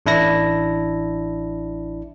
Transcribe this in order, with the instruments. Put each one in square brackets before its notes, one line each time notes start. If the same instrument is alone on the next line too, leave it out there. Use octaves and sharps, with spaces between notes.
[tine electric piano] A1 D4 E4 A#6